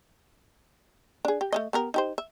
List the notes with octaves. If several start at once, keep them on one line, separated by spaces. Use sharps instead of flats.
D4 G#4
G4
A3 C#4 D#5
B3 G4 A#4
D#4 G4 C5
E5